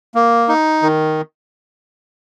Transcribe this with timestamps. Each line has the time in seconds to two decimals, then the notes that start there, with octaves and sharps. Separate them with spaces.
0.15 A#3
0.49 D#4
0.82 D#3